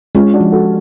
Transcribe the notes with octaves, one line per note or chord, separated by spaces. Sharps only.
G#3 C#4 F4
D4 F#4
F3
F#4 A4